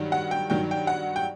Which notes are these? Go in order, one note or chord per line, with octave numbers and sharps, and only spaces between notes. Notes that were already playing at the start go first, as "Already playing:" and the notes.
Already playing: G2 D#3 F#3
F#5
G5
G2 D#3 F#3 G5
G5
F#5
G5